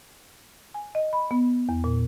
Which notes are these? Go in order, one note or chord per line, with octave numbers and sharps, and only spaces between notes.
G#5
D#5
B5
B3
E2
A#2